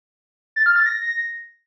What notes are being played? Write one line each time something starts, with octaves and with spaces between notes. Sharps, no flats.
A6
F6
A6
A#6